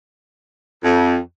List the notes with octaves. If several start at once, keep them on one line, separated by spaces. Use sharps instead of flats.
F2